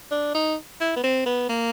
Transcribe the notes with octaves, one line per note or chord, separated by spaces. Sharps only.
D4
D#4
E4
B3
C4
B3
A#3